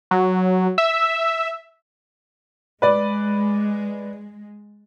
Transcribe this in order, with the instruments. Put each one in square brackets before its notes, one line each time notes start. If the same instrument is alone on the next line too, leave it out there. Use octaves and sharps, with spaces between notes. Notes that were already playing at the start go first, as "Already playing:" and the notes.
[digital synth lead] F#3
E5
[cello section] G#3 [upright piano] B4 D5